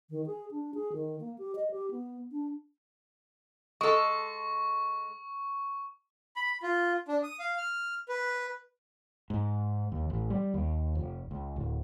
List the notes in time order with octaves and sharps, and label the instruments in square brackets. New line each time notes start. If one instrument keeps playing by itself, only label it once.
[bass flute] D#3
G#4
D4
G#4
D#3
A#3
G4
D#5
G4
B3
D4
[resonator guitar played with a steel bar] G#3 A4 [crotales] C#6
[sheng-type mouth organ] B5
F4
D4
D#6
F5
F6
B4
[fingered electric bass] G#2
D#2
A1
G3
D#2
F1
C#2
D1